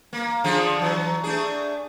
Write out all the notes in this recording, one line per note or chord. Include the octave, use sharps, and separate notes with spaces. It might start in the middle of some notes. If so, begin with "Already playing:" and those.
A#3
D3 F3 G#4
E3 F#3
A3 D4 G#4